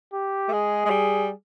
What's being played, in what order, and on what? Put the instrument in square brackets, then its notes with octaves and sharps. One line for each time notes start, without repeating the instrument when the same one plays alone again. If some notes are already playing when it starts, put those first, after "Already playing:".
[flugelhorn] G4
[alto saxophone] A3
[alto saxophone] G#3 [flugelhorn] G#4
[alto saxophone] G#3
G3